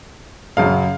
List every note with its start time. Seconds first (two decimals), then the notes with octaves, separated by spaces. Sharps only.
0.57 F#2 C#3 F5